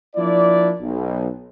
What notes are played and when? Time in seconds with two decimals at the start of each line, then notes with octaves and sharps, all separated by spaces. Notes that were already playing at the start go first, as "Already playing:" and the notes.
0.16 F3 A#3 D4 E4 D5
0.80 B1